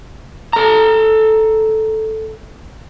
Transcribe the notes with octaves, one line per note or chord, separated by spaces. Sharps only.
A4 A#5